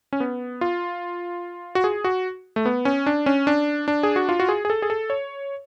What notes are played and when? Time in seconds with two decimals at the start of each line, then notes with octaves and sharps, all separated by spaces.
0.13 C#4
0.20 B3
0.61 F4
1.75 F#4
1.84 G#4
2.04 F#4
2.56 A3
2.66 B3
2.85 C#4
3.06 D4
3.26 C#4
3.47 D4
3.88 D4
4.03 G#4
4.16 F#4
4.29 F4
4.40 F#4
4.49 G#4
4.65 G#4
4.70 A4
4.82 G#4
4.90 A4
5.10 C#5